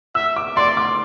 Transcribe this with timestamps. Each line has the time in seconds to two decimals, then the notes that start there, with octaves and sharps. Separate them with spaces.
0.15 E5 E6
0.36 D6
0.56 D5 C6
0.77 D6